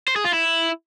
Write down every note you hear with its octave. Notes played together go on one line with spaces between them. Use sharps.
C5
G#4
F4
E4